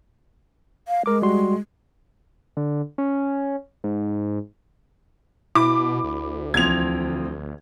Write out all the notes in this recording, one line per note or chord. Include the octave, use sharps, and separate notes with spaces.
F5
G#3 A#4 D6
G3 F#4 C6
D3
C#4
G#2
B2 E4 B5 D6
D2
C2 E3 F3 C4 G#6 F7